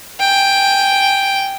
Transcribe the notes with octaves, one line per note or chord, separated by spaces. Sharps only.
G5 G#5